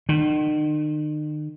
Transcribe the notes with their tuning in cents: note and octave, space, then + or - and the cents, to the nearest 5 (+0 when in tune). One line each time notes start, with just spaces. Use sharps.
D#3 -45